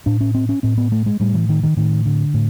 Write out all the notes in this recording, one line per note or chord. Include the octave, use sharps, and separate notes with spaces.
A2 D4
C#4
C4
C#4
A2 C4
B3
A3
G#3
A2 G3
E3
D#3
D#3
A2 D#3
D3
A2